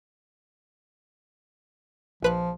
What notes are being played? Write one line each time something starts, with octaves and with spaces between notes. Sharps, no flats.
A#1 F3 B4 F#6